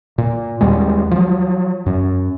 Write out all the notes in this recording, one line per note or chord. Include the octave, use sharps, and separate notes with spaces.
A#2
D#2 G3 G#3
F3 F#3
F#2